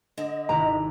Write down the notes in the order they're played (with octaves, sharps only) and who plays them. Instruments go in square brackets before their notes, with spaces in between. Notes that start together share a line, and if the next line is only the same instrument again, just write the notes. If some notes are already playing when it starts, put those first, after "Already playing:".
[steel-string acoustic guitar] D3 [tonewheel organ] D#5
[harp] G#1 C3 E4 [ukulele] A#5